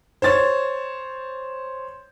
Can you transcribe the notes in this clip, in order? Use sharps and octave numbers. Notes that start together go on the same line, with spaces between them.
C5 C#5 A6